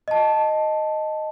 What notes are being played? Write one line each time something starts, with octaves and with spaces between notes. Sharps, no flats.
D#5 A5